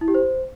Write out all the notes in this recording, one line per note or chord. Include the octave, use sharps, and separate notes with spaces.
E4
G4
C5